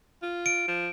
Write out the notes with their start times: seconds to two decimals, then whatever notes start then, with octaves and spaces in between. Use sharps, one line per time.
0.23 F4
0.46 D7
0.68 F3